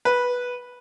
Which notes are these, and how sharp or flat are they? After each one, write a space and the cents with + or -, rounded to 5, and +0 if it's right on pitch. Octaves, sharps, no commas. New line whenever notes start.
B4 -10